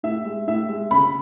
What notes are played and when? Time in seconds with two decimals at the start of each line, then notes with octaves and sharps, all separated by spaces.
0.03 A2 E5
0.25 G#3
0.47 A2 E5
0.69 G#3
0.91 C#3 B5